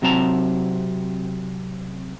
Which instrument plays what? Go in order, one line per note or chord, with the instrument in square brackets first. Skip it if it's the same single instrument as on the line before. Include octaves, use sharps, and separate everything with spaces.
[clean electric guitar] C3 F#3 C4 A5 A#5